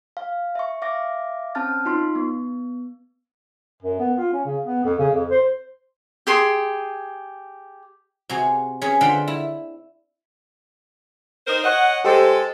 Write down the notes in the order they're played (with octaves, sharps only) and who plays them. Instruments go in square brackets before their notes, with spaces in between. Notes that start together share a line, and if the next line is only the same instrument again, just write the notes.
[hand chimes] F5
E5 C#6
E5 F5 D6 A#6
C4 C#4 A5 F6 A6
D#4 F4 C6
B3
[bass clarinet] F#2
B3
F4
C#4
C#3
B3
F2
C#3
F2
C5
[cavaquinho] G4 G#4 C6
[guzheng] C3 F#4 G#4
C#4 G#4 B5
D3 F4 C5 F#5 G5 B5
E4
[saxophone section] D#4 A#4 C5
C#5 D#5 F#5
[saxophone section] G#3 A4 [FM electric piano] G4 C5